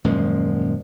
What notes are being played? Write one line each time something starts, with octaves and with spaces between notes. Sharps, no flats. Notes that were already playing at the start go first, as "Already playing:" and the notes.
D#1 F#2 F3 G#3